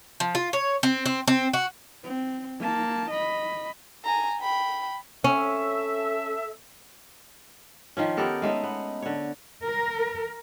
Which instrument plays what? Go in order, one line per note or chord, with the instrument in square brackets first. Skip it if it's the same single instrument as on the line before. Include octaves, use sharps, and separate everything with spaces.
[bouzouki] F3
F4
C#5
C4
C4
C4
F#4
[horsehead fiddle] C4
A#3 A5
D#5 B5
[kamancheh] G#5 A#5
G5 B5
[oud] C#4 [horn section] A4 E5
[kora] D#3 F3 C#4
B3 G4 A4 A#4
G#3 A3 C#4 D#4
B3
D3 C#5
[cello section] A#4